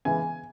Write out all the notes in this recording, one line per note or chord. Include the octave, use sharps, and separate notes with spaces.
C#3 E3 G#3 B3 G#5